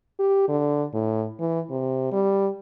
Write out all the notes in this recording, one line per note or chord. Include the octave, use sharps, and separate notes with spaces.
G4
D3
A2
E3
C3
G3